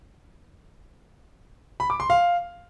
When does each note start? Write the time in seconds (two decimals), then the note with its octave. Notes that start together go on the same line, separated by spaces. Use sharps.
1.80 B5
1.90 D6
2.00 C6
2.10 F5